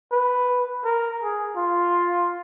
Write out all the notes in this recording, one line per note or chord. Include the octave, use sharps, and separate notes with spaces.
B4
A#4
G#4
F4